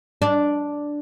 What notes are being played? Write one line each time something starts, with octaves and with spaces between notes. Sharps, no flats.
D4